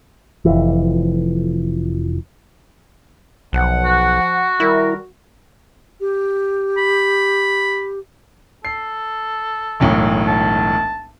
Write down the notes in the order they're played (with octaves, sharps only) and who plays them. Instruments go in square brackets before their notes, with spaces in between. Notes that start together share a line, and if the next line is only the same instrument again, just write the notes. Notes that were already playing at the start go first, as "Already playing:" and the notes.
[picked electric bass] F1 F2 E3
[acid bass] B1 [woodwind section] F3 F#5
[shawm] F#4
[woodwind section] D#3 G3 A#4 [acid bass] E4
[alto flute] G4
[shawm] B5
[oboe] A4 [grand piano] C7
[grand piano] E1 B1 A2
[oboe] A5